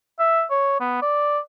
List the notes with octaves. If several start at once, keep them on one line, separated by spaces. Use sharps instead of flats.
E5
C#5
B3
D5